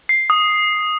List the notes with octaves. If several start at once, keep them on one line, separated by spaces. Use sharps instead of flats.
C7
D#6